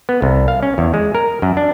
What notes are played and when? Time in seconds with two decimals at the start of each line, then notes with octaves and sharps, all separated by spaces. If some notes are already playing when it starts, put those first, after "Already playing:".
0.09 B3
0.22 C2
0.48 F5
0.63 C#4
0.78 E2
0.94 G#3
1.15 A#4
1.42 F#2
1.57 D4